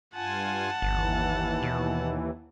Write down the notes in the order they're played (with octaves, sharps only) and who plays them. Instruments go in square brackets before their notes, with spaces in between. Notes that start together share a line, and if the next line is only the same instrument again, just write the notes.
[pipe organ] G2 F4 G#5 [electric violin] F#5 A5
[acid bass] G1 [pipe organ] D#2 E3
[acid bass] B2